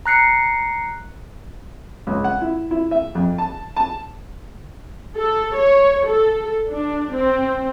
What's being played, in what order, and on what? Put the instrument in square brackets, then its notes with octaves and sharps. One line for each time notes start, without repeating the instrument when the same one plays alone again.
[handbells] A#5 F#6 C7 C#7
[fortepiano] C#2
F#5
E4
E4
E5
F2
A5
A5
[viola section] A4
C#5
A4
D4
C4